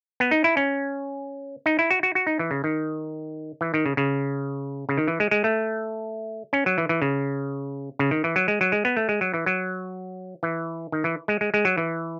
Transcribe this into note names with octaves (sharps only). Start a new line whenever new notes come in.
B3
D#4
E4
C#4
D#4
E4
F#4
F#4
F#4
D#4
E3
C#3
D#3
E3
D#3
C#3
C#3
C#3
D#3
E3
G#3
G#3
A3
C#4
F#3
E3
E3
C#3
C#3
D#3
E3
F#3
G#3
F#3
G#3
B3
A3
G#3
F#3
E3
F#3
E3
D#3
E3
G#3
G#3
G#3
F#3
E3